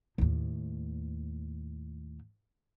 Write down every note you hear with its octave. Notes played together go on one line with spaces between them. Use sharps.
D#2 A2